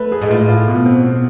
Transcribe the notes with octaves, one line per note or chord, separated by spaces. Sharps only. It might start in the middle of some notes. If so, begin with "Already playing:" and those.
Already playing: A3 B4
G#4
G#2
A2 F4
F4
B2
C4
B2